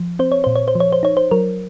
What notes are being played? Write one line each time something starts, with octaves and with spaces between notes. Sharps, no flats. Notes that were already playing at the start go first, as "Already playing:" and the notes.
Already playing: F3
C4 C5
C#5
A#2 C5
C#5
C5
F3
C#5
C5
D#4 C#5
C5
F#3 A#4